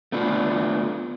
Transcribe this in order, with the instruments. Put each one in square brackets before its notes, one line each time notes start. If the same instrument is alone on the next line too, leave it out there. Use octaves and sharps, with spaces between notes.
[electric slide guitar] A3 B3 D4 F4